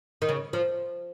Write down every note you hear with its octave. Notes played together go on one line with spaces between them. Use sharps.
D#3
C#3
F3